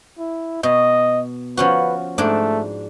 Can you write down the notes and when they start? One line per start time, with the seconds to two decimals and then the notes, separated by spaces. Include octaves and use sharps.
0.18 E4
0.63 B2 D#5
1.57 F3 C#4 F#4 B4
2.18 G#2 A3 D4